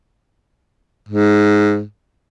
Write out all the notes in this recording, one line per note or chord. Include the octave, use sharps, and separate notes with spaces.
G#2